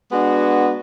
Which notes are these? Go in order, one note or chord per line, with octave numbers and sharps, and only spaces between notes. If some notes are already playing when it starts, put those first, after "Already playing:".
G#3 B3 D4 F#4